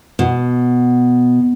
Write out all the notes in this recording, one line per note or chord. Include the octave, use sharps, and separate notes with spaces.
B2